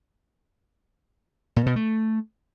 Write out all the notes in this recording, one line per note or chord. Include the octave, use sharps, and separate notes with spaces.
A#2
B2
A3